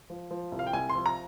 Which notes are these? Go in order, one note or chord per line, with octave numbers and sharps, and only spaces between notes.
F3
F3
C2
F5
G5
C2 G#5
C6
F3
A#5